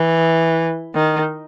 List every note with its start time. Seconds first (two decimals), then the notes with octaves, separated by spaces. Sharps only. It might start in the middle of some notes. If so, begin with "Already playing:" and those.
Already playing: E3
0.95 D#3